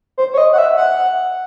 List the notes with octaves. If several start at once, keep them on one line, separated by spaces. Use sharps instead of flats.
C5
C#5
D#5
F#5
E5
F#5